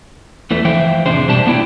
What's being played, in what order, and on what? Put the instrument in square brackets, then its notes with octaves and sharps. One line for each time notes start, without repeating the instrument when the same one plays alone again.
[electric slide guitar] E2 E3 A3
E3 F3 C5 E5 G5
F2 A2 C3 D4 G#4 C5
B2 G3 D4 G4 A5
A3 B3 D4 E4 G5